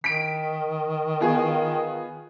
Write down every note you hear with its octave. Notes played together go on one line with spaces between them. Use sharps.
D#3 B6 D7
B3 F4 G#4